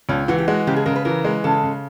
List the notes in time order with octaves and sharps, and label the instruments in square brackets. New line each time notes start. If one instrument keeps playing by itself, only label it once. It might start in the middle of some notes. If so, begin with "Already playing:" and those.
[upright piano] C#2 [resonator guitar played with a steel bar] C#4
[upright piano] E3 [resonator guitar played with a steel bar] F#4
[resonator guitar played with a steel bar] G4
[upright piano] G#3 [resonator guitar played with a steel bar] F#4
[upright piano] C#3 [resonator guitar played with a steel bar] G4
[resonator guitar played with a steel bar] G#4
[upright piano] C#3 [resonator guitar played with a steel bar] A#4
[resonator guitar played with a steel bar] B4
[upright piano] E3 [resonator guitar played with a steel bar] A#4
[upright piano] G#3
[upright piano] C#3 [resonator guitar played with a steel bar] A4
[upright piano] C#3